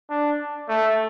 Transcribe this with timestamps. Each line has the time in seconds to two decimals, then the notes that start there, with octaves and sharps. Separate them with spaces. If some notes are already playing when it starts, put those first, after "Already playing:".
0.10 D4
0.69 A3